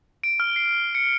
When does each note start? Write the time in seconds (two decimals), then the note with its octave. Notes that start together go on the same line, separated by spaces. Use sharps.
0.24 D7
0.40 F6
0.56 C7
0.95 C#7